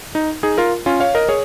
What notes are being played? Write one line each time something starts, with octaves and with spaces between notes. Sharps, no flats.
D#4
D#4 G#4
F4 A#4
C#4 F4
C#5 F5
A#4 D#5
G#4 C#5